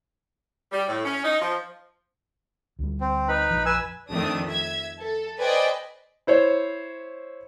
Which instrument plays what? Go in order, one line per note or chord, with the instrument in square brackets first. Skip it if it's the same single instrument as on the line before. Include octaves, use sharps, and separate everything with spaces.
[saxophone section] G3
A2
C#4
D#4
F3
[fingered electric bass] D2 G3
[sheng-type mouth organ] C4
D#4 B4 B5
[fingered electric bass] A#1 F2 F3
[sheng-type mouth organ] B4 G#5 E6
[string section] F2 D#3 A3 D4 D#6
E5 G#6
A4
B4 C5 D5 D#5 G5 G#5
[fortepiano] E4 C5 C#5